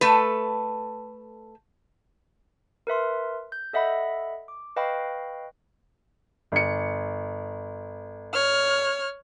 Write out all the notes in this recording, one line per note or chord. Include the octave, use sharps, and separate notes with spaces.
A3 A4 B4
A#4 B4 E5 C6
G6
A4 D#5 E5 F#5 B5
D6
B4 D#5 F5 G5 B5 C#6
G1 C#7
C#5 F6